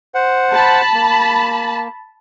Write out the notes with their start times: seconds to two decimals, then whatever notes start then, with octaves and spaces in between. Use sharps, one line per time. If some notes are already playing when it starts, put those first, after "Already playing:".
0.15 C5 F#5
0.54 A5 B5
0.93 A#3